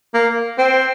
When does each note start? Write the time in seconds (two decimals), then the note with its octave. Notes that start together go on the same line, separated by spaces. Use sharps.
0.14 A#3
0.58 C4